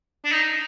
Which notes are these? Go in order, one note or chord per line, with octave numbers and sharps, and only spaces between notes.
D4
D#4